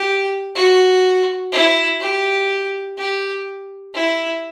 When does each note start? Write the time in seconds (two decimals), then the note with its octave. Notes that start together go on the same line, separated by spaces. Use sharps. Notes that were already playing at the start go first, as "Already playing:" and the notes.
Already playing: G4
0.56 F#4
1.52 E4
2.00 G4
2.97 G4
3.94 E4